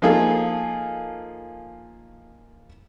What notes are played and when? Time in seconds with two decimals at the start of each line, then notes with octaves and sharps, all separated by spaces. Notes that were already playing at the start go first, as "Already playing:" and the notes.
0.02 F3 A#3 D#4 F4 G#4 A4